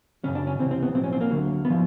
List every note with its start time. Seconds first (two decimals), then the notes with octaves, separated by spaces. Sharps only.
0.24 F#2 C#3 F#3 C#4
0.35 D4
0.47 C#4
0.59 C#2 C3 E3 C4
0.71 C4
0.83 B3
0.94 B1 A2 F3 C4
1.03 C#4
1.13 C4
1.21 A#3
1.30 D2 D3 F#3
1.65 B3
1.70 F3